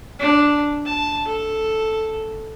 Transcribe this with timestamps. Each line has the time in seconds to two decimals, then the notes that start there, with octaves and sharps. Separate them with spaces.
0.20 D4
0.86 A5
1.27 A4